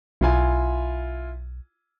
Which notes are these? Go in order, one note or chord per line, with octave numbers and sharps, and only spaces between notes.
B1 E4 F4 G#5